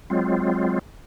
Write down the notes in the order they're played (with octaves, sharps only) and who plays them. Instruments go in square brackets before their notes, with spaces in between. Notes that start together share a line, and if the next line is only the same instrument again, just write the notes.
[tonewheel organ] F#3 G#3 C4 F4